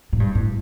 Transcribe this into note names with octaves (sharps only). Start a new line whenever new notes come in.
A2
G2
A2